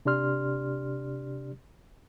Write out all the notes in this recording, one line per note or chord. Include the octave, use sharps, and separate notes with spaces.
C3 D4 G4 D5 C6 F6